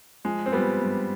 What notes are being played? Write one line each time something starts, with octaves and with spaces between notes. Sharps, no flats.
F3 G#3
C4
F3 G3 B3
G2